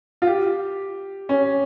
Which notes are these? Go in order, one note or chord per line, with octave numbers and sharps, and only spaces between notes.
F4
G4
C#4